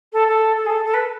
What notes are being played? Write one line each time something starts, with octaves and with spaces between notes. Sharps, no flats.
A4
A4
A4
G#4
A4
A4
B4